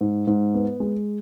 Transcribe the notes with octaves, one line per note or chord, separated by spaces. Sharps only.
G#2
G#2
B3
G#3